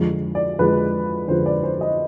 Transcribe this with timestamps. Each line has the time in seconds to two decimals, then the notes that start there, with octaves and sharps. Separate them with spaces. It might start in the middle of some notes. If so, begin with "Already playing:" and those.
Already playing: F2 D3 F3 G#3
0.35 D5
0.59 F2 D3 F3 G#3 B4
1.28 F2 D3 F3 G#3 C5
1.46 D5
1.63 C5
1.81 D#5